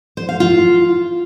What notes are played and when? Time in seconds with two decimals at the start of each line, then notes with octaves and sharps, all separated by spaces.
0.17 C5
0.29 F5
0.40 F4